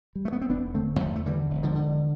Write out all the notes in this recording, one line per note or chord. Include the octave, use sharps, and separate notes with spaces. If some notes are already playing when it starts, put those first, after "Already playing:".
G3
A3
B3
C4
E1 B3 D4
D3 A3 C4
E2 F3 A3
A3
D3 E3 G3
E1
D3 F3
D3